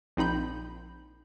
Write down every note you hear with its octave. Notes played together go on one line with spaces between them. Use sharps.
A#1 C4 D#4 B5 G6